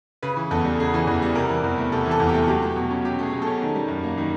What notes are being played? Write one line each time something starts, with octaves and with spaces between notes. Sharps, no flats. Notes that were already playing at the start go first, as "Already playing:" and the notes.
C#3 B4
E3
E2 A4
G3
C#3 G#4
E3
E2
G3
C3 A#4
E3
E2
A3
C3 A4
E3
A4
E2
G4
A3
F#3 G4
A3
B2
C#4
F#3 G4
A3 G#4
B2
A4
C#4
D#3
G3
F#2
A#3
D#3